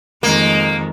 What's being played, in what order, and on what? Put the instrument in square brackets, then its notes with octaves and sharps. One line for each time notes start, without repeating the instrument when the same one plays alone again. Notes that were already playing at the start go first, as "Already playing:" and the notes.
[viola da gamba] F2 D#3 G#3 [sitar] A#3